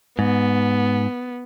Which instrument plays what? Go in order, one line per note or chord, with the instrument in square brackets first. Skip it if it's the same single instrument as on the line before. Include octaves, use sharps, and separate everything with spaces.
[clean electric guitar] G#2 [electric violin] B3